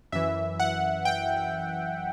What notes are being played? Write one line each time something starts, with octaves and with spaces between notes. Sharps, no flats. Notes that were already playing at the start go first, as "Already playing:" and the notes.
F#2 E3 E5
F#5
G5